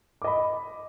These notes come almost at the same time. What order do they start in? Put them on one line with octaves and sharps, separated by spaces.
D6 D#5 B5